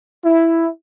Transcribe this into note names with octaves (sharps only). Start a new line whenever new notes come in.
E4